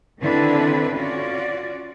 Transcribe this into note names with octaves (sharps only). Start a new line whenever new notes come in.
D3 D#3 C4 D4 E4 B4
C#4 F4 F#4 D5